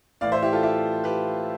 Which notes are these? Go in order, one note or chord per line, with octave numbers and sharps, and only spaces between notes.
A2 E3 D5 F5
C5 E5
E4 G4
F4 A4
E4 G4
G4 B4